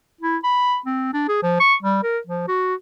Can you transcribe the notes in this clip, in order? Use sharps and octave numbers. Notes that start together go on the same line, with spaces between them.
E4
B5
C4
D4
G#4
F3
C#6
G3
A#4
F3
F#4